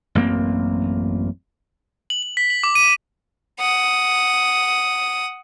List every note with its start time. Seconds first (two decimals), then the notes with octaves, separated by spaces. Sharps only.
0.15 A1 F#2 A#3 C4
2.10 F#7
2.23 F#7
2.37 B6
2.50 F#7
2.63 D6
2.75 D#7
3.59 F#5 D#6